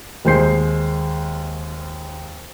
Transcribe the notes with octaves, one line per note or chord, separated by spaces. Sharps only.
D#2 G#3 C5 C6 G6 C7